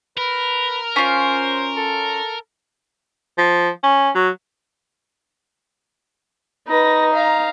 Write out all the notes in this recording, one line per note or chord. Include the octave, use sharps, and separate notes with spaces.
A#4 B4
C#4 F4 C5
A4
F3
C#4
F#3
D#4 B4 A#6
F5 A#5